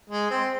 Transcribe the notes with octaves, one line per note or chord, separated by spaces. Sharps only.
G#3
C4